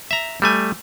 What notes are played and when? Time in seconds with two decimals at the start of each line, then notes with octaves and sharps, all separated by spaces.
0.11 E5 A#5
0.42 G3 A3 G#5